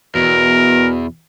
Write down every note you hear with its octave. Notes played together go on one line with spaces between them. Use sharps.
E2 B2 A#4